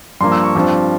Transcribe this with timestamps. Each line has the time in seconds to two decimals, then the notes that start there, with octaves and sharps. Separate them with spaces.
0.21 G2 F3 A#3 C6
0.32 E6
0.44 C#6
0.55 G2 F3 C4